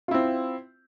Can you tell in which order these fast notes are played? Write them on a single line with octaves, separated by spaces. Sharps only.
F4 E4 C4